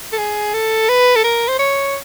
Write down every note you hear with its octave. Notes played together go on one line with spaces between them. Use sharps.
A4
G#4
A4
B4
A4
A#4
C5
C#5